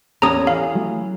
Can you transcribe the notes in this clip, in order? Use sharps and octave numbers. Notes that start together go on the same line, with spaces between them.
E2 A#3 C#4 G4 A4 A#5 D#6
E3 F5
F#3 A3